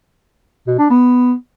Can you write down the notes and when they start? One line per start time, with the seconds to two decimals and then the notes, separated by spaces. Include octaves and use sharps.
0.67 B2
0.78 D4
0.90 B3